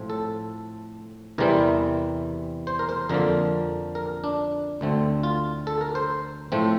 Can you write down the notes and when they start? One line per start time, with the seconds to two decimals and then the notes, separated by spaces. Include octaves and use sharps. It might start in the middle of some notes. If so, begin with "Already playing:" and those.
Already playing: A2 F3 C4
0.10 A4
1.38 E2 C3 E3 G3 C4 A#4
2.67 C5
2.79 A#4
2.89 C5
3.09 F2 D3 F3 A#3 A#4
3.95 A#4
4.24 D4
4.81 D2 D3 A3 C4
5.23 F4
5.67 A4
5.81 A#4
5.95 C5
6.52 A2 F3 A3 C4